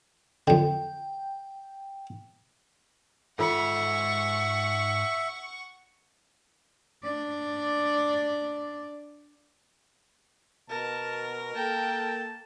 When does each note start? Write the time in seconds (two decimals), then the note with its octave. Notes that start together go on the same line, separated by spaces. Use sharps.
0.47 F2 D3 G5
3.39 G#2 F4 A4 E5 F#5 B5 C#6
7.04 D4 D5
10.69 B2 A#4 A5
11.55 A#3 A4 G5 A5